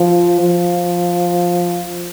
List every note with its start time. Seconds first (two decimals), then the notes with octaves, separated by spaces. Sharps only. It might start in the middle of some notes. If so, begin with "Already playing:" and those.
Already playing: F3
0.41 F3